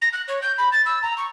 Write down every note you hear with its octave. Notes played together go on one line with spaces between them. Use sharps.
A#6
F#6
C#5
G6
B5
A6
E6
A#5
C#6